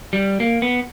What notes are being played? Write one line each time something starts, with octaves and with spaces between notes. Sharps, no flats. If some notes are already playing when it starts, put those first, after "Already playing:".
G3
A#3
B3